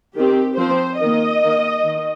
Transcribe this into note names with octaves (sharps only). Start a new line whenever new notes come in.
D#3 C4 G4
F3 C4 C5
D#3 A#3 D#5
D#3 A#3
D#3